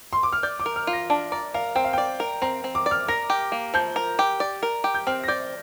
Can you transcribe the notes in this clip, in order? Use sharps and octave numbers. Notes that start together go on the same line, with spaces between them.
C6
D6
F6
D5 G6
D6
A#4
F6
F4
A#6
D4
D5 A#5
A#4 F5
C4 G5
F5
D5 G5
A#4
C4 A#5
C4
D6
D5
F6
A#4 A#6
G4
A#3
F3 G6
A#4
G4
D5
A#4
G4
G6
C4 F6
A#6
D5 G6